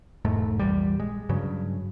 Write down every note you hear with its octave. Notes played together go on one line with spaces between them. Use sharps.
E1 G#2 A3
A#1 E2 G3
G#3
G2 C#3 F#3